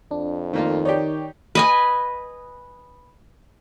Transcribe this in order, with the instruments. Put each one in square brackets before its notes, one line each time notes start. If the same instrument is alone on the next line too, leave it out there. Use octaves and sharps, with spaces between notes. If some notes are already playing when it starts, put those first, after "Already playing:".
[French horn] F2 [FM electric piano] D4
[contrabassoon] D#3 [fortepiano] A3 A#3 F4
[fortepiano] D#4 G4 [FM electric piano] C#5 D5 G5
[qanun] B4 D#5 G#5